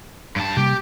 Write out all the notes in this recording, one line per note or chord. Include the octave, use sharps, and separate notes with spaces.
G2 A5
C3 G3 A#3 G4